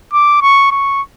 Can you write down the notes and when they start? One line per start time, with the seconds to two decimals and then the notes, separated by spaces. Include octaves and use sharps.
0.13 D6
0.42 C#6
0.71 C#6